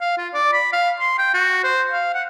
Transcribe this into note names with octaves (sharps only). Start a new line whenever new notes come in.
F5
F4
D5
B5
F5
C6
G5
F#4
C5
F5
F#5